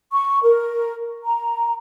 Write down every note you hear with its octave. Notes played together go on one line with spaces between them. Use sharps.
C#6
A#4
A#5